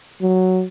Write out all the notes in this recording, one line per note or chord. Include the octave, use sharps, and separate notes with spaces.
F#3